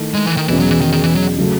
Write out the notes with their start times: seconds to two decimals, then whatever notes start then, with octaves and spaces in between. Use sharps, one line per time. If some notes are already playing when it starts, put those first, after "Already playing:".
Already playing: D#3 A3 E4
0.14 G#3
0.26 E3
0.37 D#3
0.48 E2 B2 E3 G#3 C#4
0.59 F#3
0.71 E3
0.81 D#3
0.92 D#3
1.04 E3
1.15 F#3
1.38 C#3 F#3 A3